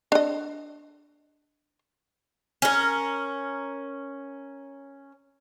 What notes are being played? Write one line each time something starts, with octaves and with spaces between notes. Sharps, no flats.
D4 D#5
C#4 A#4